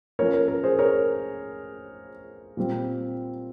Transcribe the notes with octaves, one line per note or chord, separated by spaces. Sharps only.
F3 A#3 C#4 A#4 C#5
A#4
A#4
G#4 C5
A#4 C#5
A#2 G3 C4